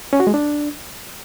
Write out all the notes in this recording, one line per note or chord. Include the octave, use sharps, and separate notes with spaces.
C#4
F#4
G#3
D4